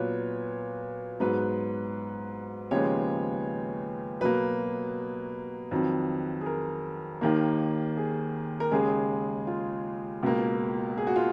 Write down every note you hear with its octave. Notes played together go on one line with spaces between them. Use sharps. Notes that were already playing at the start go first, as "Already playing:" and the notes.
Already playing: A#2 F#3 B3 B4 C#5
G#2 F#3 B3 B4
D#2 C#3 F3 G#3 B3 C#5
B2 F#3 A#3 B4
F2 D#3 F#3
G#4
A#4
D#2 D#3 A#3
G#4
A#4
D#2 C#3 G#3 G#4
F4
C#2 B2 A#3
G#4
F#4
F4